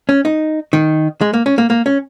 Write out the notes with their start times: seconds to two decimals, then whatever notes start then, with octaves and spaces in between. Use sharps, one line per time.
0.09 C#4
0.25 D#4
0.73 D#3
1.21 G#3
1.34 A#3
1.46 C#4
1.58 A#3
1.70 A#3
1.86 C#4